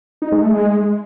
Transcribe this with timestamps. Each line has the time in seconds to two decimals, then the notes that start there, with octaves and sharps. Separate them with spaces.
0.22 D#4
0.32 G#3
0.42 A3
0.53 G#3